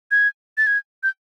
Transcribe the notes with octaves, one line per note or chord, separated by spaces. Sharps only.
G#6
A6
G#6
G6